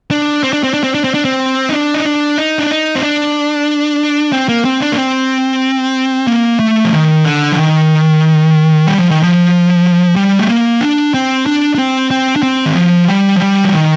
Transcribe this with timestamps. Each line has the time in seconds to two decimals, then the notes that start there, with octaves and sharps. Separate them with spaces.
0.11 D4
0.43 C4
0.53 D4
0.64 C4
0.74 D4
0.84 C4
0.94 D4
1.04 C4
1.14 D4
1.25 C4
1.69 D#4
1.73 D4
1.94 D#4
2.05 D4
2.38 D#4
2.59 D4
2.71 D#4
2.96 C4
3.03 D4
4.32 C4
4.49 A#3
4.65 C4
4.81 D4
4.92 A#3
4.98 C4
6.27 A#3
6.60 A3
6.85 F3
6.92 D#3
7.25 D3
7.52 F3
7.56 D#3
8.87 G3
8.99 F3
9.11 D#3
9.23 F3
10.16 G3
10.39 A3
10.49 A#3
10.81 D4
11.14 C4
11.46 D4
11.75 D4
11.79 C4
12.11 C4
12.36 D4
12.43 C4
12.66 D#3
12.75 F3
13.08 G3
13.36 F3
13.41 G3
13.64 F3
13.73 D#3